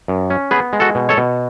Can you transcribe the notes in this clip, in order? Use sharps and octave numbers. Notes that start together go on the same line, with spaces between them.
F#2
C#4
B3 G#4 B4
G#3
F#4 A4
B2
A4 C#5
B2